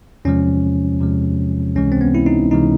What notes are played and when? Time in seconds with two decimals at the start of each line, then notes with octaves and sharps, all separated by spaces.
0.25 E2 C3 F3 G#3 C#4
1.00 E2 C3 F3 G#3
1.75 C#2 C3 E3 G#3 C#4
1.92 C4
2.01 B3
2.15 E4
2.26 D#4
2.51 C#2 C3 E3 G#3 D#4